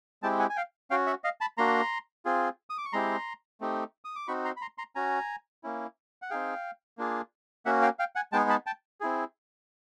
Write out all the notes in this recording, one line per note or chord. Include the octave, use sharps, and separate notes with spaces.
G#3 C4 E4 G4 G5 A5
F#5 G#5
G#5
F5 G5
C#4 F#4 F5 G5
E5 F#5
D#5 F5
A5 B5
A#3 D4 F#4 A#5 C6
C4 F4 G#4
D#6
D6
C#6
G#3 C4 E4 G4 A#5 C6
A3 C4 D#4 G4
D#6
D6
C4 D#4 F#4 B5 C#6
A#5 C6
B5
A#5 C6
A#5 C6
C#4 F#4 G#5 A#5
A#3 C#4 E4
F#5
C4 D#4 G#4 F5 G5
A#3 D4 F4 G#4
A#3 C#4 F#4 E5 F#5
F5 G5
F5 G5
F#5 G#5
G#3 B3 D#4 G#4 G5 A5
A5 B5
G5 A5
C4 E4 G#4